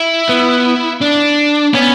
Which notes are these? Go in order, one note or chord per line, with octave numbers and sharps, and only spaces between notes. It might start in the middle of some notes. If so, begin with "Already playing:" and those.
Already playing: E4
B3
D4
B3 C#4